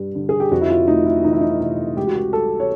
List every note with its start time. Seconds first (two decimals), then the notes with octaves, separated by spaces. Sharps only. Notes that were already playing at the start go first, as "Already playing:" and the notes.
Already playing: G2 G3
0.15 D3
0.29 G#4
0.40 G4
0.51 F2 F#4
0.61 E4
0.70 F4
0.88 A3 D#4
1.06 E4
1.24 E3 D#4
1.33 E4
1.41 D#4
1.60 C3 E4
1.97 C#2 G4
2.07 F#4
2.16 G4
2.33 G3 A4
2.60 C#5